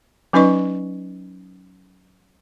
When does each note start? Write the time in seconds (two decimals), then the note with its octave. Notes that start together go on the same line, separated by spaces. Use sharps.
0.33 F#3 C#4 D#4 B4 D#5 C#6